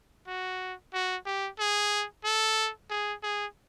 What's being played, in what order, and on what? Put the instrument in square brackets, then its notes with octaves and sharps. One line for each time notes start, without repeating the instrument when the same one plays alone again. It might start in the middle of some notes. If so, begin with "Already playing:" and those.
[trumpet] F#4
F#4
G4
G#4
A4
G#4
G#4